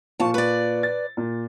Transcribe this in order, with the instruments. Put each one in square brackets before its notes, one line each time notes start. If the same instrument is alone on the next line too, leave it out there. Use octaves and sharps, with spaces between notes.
[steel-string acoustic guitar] F2 A5 [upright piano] A#2 F4 C#6
[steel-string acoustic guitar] B4 D5
[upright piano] A6
A#2